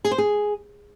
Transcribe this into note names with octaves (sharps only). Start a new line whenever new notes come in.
G#4
C5
G#4